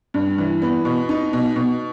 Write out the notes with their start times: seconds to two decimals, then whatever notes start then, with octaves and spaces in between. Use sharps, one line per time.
0.14 G2
0.38 E3
0.62 B3
0.85 B2
1.09 D#4
1.33 B2
1.56 B2